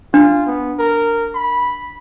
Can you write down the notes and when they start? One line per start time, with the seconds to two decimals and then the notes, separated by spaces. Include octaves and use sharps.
0.14 D4 F4
0.47 B3
0.79 A#4
1.35 B5